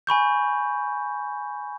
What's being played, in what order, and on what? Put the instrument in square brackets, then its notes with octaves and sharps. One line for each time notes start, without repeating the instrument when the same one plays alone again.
[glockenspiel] G#5 B5 C#6 G6